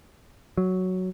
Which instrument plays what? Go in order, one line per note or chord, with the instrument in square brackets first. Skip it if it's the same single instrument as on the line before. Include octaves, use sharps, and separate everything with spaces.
[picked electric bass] F#3